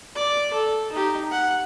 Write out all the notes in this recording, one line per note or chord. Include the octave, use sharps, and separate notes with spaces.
D5 D6
A4
D#4 G4
F#5